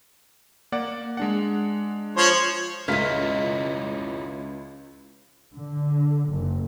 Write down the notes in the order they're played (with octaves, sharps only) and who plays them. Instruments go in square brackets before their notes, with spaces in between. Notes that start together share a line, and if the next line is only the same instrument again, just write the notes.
[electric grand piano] A#3 D5 F#5
G#3 D4 F#5
[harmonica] F3 C5 C#5
[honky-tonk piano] C#2 B6 [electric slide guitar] C#4 E4 F4 [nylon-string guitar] D#5 F5
[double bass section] D3
F#1